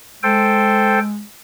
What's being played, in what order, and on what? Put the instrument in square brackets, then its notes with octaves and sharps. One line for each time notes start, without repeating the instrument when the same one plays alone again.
[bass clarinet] G#3 [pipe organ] A4 C5 G5